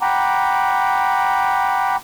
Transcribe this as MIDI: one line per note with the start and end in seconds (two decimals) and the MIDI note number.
0.02 1.96 78
0.02 1.96 79
0.02 1.96 82
0.02 1.96 83
0.02 1.96 86